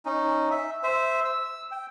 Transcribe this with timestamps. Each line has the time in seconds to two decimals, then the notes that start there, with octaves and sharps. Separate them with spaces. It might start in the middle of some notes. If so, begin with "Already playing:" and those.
0.05 C#4 D#4
0.51 E5
0.83 C5 E5
1.25 E6
1.71 G5